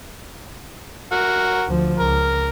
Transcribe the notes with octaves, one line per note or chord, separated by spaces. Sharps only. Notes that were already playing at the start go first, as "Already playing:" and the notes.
F#4 A#4
D2 F3
C#2 A#4